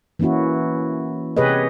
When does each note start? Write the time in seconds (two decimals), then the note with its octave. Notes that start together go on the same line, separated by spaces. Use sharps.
0.19 E3 A#3 C#4 E4 F#4
1.37 C3 G4 G#4 B4 C#5 D#5